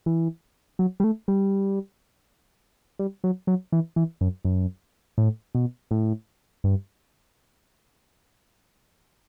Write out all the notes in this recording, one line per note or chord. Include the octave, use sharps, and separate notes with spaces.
E3
F#3
G3
A3
G3
G3
F#3
F#3
E3
E3
F#2
F#2
A2
B2
A2
G2